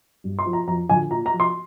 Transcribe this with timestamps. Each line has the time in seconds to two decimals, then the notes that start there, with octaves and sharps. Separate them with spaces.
0.24 G2
0.39 C6
0.46 F3
0.53 A#5
0.67 F2 A#5
0.89 D3 F3 G#5
1.11 A#2 A#5
1.26 A#5
1.33 F3
1.40 C6